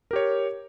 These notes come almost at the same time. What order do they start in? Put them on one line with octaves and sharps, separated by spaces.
A#4 G4 C#5